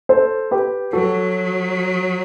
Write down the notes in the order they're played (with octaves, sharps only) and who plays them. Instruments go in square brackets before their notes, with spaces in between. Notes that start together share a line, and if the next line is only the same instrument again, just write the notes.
[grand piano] A4 C5
G4 B4
[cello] F#3 [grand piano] F#4 A4